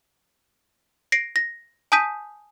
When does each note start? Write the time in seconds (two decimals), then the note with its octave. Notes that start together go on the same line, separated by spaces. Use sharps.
1.12 A#6 C7 D7
1.36 A#6
1.92 G#5 A5 D#6 G6 B6 D#7